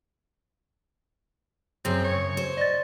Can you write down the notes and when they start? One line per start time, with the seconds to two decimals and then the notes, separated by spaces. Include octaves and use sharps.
1.85 F#2 C#3 C4
2.04 C#5
2.37 C5
2.57 D5 D#5 A6